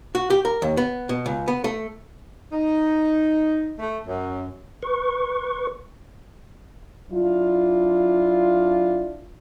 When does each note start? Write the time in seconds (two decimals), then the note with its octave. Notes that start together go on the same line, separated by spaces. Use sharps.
0.15 F#4
0.30 G4
0.45 A#4
0.62 D#2
0.77 B3
1.09 B2
1.26 C#2
1.48 B3
1.64 A3
2.52 D#4
3.79 A3
4.07 F#2
4.83 B4 C#6
7.11 F#3 D4 E4 F4